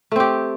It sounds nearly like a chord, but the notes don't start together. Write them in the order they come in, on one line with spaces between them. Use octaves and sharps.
A3 C4 G4